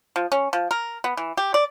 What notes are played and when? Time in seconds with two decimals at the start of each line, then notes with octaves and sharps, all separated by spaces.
0.16 F3
0.32 C#4
0.53 F3
0.71 A#4
1.04 B3
1.17 E3
1.37 G4
1.54 D5